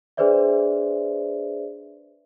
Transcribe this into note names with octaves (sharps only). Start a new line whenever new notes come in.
D4 G#4 B4 C5 D5 E5